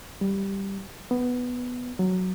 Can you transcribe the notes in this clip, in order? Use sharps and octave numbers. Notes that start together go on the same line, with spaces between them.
G3
B3
F#3